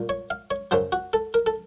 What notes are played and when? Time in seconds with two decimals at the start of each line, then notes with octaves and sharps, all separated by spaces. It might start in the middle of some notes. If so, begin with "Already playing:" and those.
Already playing: C2 A#2
0.09 C#5
0.30 F5
0.51 C#5
0.71 F#2 C#3 F#3 C5
0.92 F#4
1.13 A4
1.34 A#4
1.46 A4